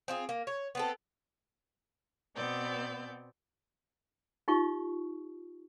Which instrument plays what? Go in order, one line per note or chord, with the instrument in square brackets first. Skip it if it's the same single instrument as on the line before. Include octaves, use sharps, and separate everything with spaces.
[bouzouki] C4 F4 G#4
A#3
C#5
B3 C4 A4
[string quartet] B2 B3 C4 D5 G6
[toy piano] D#4 F4 G4 C#6